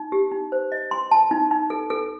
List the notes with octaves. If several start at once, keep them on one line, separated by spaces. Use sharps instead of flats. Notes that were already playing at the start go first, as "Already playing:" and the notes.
Already playing: D#4
G4
D#4
C5
D#5
C6
A5
D#4
D#4
A4
A4